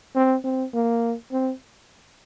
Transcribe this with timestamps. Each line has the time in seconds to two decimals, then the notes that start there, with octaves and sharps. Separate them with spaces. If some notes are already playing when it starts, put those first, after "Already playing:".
0.16 C4
0.44 C4
0.74 A#3
1.32 C4